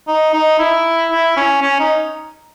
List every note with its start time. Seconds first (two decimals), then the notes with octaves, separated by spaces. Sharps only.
0.07 D#4
0.33 D#4
0.59 E4
1.11 E4
1.37 C#4
1.62 C#4
1.80 D#4